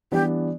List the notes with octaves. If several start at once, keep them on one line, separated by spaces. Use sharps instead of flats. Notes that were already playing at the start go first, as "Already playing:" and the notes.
E3 G3 B3 D4 G4